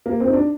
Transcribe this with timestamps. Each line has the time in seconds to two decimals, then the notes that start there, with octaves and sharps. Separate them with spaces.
0.06 A#3
0.20 C4
0.27 D#4
0.33 D4